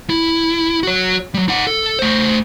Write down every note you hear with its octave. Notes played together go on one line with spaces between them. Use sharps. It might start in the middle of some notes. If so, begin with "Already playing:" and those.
E4
F#4 C#5
F#3 G3
D#4 F#5
A4
A3 C5